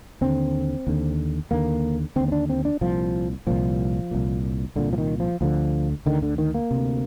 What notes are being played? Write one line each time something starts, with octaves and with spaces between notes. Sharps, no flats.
D#2 D3 C4
D#2 D3
D#2 D3 A#3
D#2 D3 C4
C4
D4
C4
D4
C2 A#2 F3
C2 A#2 F3
C2 A#2
C2 A#2 D3
F3
D#3
F3
D2 D3 F3
D2 D3 D#3
D3
D#3
A#3
D2 C3